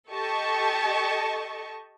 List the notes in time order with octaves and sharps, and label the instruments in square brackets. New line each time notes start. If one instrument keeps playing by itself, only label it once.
[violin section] G4 A4 D#5 A5 C#6